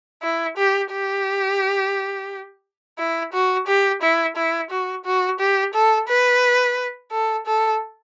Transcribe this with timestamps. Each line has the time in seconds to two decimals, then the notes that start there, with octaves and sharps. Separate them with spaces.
0.22 E4
0.57 G4
0.92 G4
2.98 E4
3.32 F#4
3.67 G4
4.02 E4
4.36 E4
4.71 F#4
5.05 F#4
5.39 G4
5.74 A4
6.08 B4
7.12 A4
7.46 A4